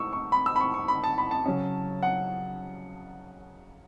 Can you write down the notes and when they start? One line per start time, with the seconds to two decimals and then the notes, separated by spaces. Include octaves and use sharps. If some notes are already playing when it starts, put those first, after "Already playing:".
Already playing: A2 C#6 E6
0.13 C#6
0.32 B5
0.46 E6
0.56 B5
0.61 C#6
0.74 C#6
0.88 B5
1.04 A5
1.18 B5
1.31 A5
1.46 C#3 F#3 C#4
2.03 F#5